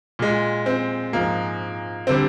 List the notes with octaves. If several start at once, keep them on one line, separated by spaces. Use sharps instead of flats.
A#2 G#3
C4
G#2 F3 G#3 A#3
D3 G3 C4